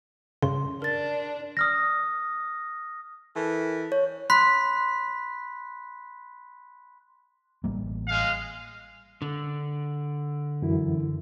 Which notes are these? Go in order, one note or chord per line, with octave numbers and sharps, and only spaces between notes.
G2 C#3 C6
D4 A#4 A6
D#6 F6 A#6
E3 A4 A#4
C#5
B5 C6 F#6 B6
A1 G3 A#3
G#3 F5
D3
F#2 E3 E4